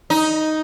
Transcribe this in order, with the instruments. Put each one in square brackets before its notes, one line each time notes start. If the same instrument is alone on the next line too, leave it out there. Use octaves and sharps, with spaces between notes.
[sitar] D#4